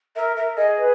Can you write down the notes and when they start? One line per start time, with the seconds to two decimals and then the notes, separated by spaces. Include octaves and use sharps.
0.16 A#4 E5
0.36 A#4 E5
0.57 G#4 D#5
0.78 B4